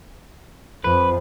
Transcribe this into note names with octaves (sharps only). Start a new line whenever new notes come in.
F2 B4